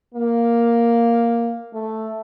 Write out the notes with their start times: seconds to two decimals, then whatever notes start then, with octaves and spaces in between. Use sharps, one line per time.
0.14 A#3
1.74 A3